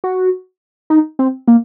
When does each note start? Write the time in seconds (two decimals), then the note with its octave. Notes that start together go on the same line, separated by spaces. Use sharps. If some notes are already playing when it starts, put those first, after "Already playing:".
0.04 F#4
0.90 D#4
1.19 C4
1.48 A#3